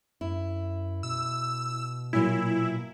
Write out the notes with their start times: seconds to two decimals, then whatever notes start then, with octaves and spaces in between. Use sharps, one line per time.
0.21 F#2 E4
1.03 B2 E6
2.13 A#2 F#3 A#3 E4